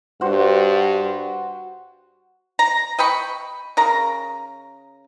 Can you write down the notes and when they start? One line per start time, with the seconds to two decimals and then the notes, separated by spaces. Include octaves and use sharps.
0.21 G2 F#4 C5 F#5
2.59 A#5
2.99 D#5 G5 B5 C#6
3.77 C#3 A#4 A#5